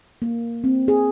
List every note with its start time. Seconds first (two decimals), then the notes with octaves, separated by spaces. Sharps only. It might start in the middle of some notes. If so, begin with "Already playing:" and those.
0.22 A#3
0.64 C4
0.88 G#4